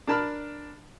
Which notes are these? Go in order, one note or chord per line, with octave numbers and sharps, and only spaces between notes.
D4 A#4 A5 B5 F6